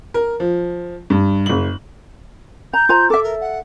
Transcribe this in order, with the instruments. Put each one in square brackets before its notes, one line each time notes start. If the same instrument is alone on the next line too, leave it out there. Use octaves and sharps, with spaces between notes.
[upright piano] A#4
F3
G2
F#1 F#7
[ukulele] A#5 [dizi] G6
[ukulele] F4 C5 A#5
[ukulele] A4 E5 [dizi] D6
[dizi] A#4
F#5